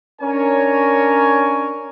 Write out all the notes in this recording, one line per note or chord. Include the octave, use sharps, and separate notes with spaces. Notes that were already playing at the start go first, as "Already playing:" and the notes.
C#4 D4 A#4 C#5 G#5